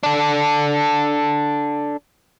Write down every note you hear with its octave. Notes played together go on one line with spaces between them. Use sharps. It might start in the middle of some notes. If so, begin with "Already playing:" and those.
D4 A4